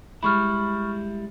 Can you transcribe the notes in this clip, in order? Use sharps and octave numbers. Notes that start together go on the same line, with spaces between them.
G3 G#3 E4 B5 C#6 F6